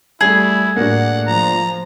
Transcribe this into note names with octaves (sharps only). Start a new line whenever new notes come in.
G3 A3 E4 G#4
A2 A#3 D4 F#4 F#5
F3 A#5